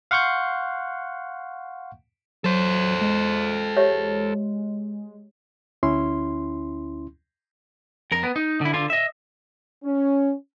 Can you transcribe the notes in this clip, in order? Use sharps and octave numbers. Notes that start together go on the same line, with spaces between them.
F5 F#5 C6 C#6 F#6 G6
F#3 A4 C5
G#3
G4 C#5 E5
D2 C#4 E4 C6
F2 A#4
B3
D#4
D3 E4
D3 F4
D#5 E5
C#4